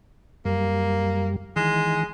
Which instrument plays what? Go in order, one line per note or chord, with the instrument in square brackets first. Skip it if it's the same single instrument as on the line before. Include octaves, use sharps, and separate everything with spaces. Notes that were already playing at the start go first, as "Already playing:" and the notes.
[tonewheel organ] F#2 G3 [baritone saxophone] A#3
[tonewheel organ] D#3 E3 [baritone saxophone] G#3